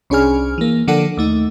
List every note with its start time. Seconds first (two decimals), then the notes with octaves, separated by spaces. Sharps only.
0.10 C2 C#4 D4 G#4 G#5 F6
0.58 E3 A#3
0.88 D3 F3 A#3 D4 A4 F#5
1.17 D#2 A3 D#4